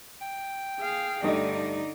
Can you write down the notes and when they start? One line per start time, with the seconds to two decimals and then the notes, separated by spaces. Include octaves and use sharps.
0.22 G5
0.80 G#4 F5
1.24 G2 D3 A3 D#4 D5 D#5